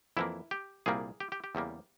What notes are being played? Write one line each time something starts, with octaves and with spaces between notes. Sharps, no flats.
F2 E3 A#3 E4
G4
C2 A#2 G3 A#3 G#4
G4
G4
G4
E2 C#3 G3 A#3